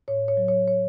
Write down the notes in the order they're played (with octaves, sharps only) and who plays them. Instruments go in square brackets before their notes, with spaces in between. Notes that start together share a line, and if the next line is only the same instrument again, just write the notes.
[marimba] A2 C#5
C#5
F#3
C#5
C#5